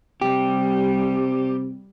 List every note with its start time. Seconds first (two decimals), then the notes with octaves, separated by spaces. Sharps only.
0.22 C3 G3 G4